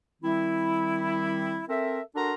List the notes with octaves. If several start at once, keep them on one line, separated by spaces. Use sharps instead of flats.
D#3 G3 C4 E4
C4 A4 A#4 E5
D4 F#4 A4 A#4 A#5 C6